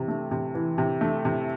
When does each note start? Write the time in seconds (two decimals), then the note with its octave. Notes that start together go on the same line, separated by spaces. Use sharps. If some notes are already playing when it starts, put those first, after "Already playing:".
Already playing: C3 E3
0.08 A3
0.31 C3
0.55 E3
0.78 C3
1.01 A3
1.25 C3